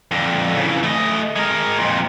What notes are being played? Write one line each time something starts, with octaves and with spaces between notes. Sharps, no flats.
F2 D3
C#3 E3
A3 D#5
G#3 A#4
F2 A#2